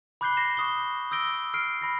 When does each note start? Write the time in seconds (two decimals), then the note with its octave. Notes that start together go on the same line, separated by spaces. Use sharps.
0.21 B5 D6 F#6 G6 C7 G7
0.37 D6 A#6 C7 E7
0.57 C#6 D#6 G7
1.11 D#6 E6 G6 A#6 D7 G7
1.54 F6 C7 D7
1.81 B5 A#6 C7